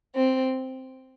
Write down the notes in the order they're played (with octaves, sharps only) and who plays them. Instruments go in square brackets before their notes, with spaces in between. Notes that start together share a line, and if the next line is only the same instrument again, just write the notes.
[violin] C4